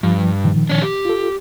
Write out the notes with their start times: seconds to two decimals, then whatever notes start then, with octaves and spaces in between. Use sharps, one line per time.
0.03 G2 F3
0.44 A#2 D#3 F3
0.70 D4 C#5
0.82 G4
1.05 F4 A4